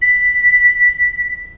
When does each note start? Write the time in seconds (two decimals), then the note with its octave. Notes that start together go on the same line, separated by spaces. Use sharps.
0.02 B6